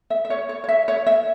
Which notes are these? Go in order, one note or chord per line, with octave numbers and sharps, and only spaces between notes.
E5
E5
C#5
C#5
C#5
E5
C#5
E5